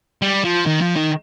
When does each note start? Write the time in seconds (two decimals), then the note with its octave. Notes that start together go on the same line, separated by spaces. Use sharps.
0.22 G3
0.44 F3
0.66 D#3
0.81 F3
0.96 D#3